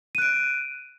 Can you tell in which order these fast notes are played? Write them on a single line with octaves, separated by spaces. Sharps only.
D#7 F#6 D7